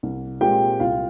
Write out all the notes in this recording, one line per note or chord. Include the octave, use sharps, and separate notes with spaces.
C2
A#2 G#3 C4 G4 G5
C2 F4 F5